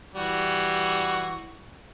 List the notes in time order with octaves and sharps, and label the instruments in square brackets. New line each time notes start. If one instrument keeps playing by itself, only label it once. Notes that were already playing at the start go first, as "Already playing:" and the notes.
[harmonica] E3 G3 F#4